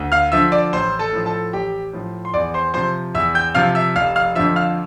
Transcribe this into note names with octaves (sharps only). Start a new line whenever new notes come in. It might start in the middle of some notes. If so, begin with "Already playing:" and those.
Already playing: D2
F5 F6
D3 F3 E5 E6
D5 D6
A1 C5 C6
A4 A5
A2 F3
A4 A5
A1 G4 G5
A2 F3
C6
E2 D5 D6
C5 C6
C3 F3 C5 C6
E2 E5 E6
G5 G6
C3 F3 F5 F6
E5 E6
F1 F5 F6
F5 F6
F2 D3 F3 E5 E6
F5 F6